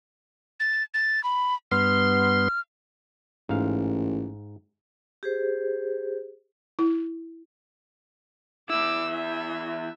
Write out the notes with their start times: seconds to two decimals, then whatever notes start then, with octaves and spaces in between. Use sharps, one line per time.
0.60 A6
0.94 A6
1.24 B5
1.71 G2 B3 C6 F6
3.49 A1 G#2 F5
5.23 G4 G#4 C5
6.79 E4
8.70 E2 E4 D6 E6
9.11 E5